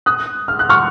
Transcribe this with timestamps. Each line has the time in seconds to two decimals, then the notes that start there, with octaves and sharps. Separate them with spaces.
0.06 D#6 F#6
0.48 F6
0.59 F#6
0.69 C#6 F6